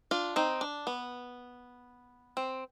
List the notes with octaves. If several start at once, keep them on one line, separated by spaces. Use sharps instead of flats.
D4 F4
C4 D#4
D4
B3
C4